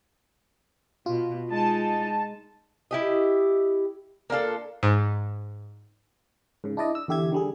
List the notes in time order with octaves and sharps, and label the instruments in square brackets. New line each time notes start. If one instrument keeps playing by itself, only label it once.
[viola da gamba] B2 [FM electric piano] F4
[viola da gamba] G#3 D#4 [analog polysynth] A5
[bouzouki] E4 G4 D#5
A#3 D4 F4 A4
[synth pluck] G#2
[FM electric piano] G#2 C#3
D4 E4 D5 D#5
E6
E2 D3 G4 E5 G#6
D3 G3 G#4